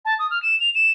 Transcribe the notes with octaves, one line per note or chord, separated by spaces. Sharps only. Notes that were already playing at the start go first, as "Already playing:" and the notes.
A5
D#6
F6
E7
F7
E7